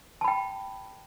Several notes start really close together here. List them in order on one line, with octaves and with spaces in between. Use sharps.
A5 B5 G5